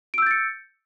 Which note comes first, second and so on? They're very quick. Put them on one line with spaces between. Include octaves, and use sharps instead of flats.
D7 E6 G6 A6 C#7